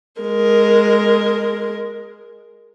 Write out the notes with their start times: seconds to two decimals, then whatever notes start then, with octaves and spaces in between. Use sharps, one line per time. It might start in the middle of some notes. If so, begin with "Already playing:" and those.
0.21 G#3 A#4